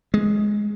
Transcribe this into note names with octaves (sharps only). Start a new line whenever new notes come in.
G#3